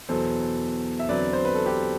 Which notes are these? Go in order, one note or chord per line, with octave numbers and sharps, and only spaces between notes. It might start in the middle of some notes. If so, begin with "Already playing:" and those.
E2 B2 F#3 A4 C5
E5
E2 D3 F#3 C4 B4 D5
C5
B4
A4
G4 B4